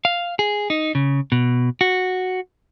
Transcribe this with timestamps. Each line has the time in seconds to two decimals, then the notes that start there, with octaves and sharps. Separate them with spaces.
0.05 F5
0.39 G#4
0.70 D#4
0.95 C#3
1.32 B2
1.81 F#4